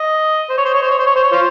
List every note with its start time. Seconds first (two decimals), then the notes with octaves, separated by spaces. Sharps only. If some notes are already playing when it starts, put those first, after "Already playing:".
Already playing: D#5
0.50 C5
0.57 C#5
0.65 C5
0.74 C#5
0.82 C5
0.90 C#5
0.99 C5
1.07 C#5
1.15 C5
1.23 C#5
1.32 F4 C5